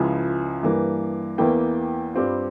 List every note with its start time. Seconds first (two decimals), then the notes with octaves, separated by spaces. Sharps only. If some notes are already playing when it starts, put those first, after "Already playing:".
Already playing: C#2 C#3 F3 G#3 E4 G#5
0.63 G2 E3 A#3
1.38 E2 E3 A#3 E4 G5
2.15 G2 G3 C4 F4